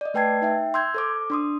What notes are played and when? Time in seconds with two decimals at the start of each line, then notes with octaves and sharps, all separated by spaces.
0.01 D5 D#5
0.14 A3 B4 G5 A5 G#6 C7
0.42 D#4 E5 G5
0.74 C6 E6 G6 G#6
0.94 A4 C5 D6
1.30 D4 C6 D#6